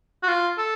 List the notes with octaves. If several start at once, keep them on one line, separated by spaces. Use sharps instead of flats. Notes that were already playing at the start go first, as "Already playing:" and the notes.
F#4
F4
A4